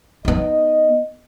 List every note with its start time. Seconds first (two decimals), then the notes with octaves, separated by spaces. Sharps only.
0.25 B3 D#4 D#5